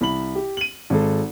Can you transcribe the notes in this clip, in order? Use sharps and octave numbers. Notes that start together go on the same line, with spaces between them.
C2 B5 F#7
G4
D#7 F#7
G#1 G#3 A4